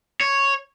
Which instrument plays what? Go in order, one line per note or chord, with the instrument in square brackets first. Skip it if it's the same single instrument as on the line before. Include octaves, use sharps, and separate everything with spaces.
[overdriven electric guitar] C#5